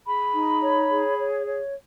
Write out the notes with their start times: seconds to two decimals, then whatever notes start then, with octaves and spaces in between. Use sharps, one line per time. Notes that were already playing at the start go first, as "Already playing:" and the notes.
0.06 G#4 B5
0.35 D#4
0.62 C#5
0.90 G#4
1.18 C#5
1.47 C#5